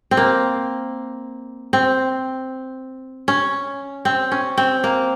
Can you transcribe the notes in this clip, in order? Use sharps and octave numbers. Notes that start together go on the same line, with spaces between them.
C4
A#3
C4
C#4
C4
C#4
C4
A#3